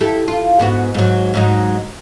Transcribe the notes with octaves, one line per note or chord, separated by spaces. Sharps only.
E4 G4 A4
F4
G#2 B3 F#4
G#2 F#3
G#2 F#3 D#4